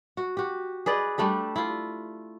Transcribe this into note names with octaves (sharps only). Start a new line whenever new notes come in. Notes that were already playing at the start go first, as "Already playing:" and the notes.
F#4
F#4 G4
G#4 B4 D5 D#5
G3 A3 D4 G4
E4 F4